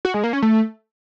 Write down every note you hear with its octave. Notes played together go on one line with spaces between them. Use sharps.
F#4
G#3
A#3
C#4
A3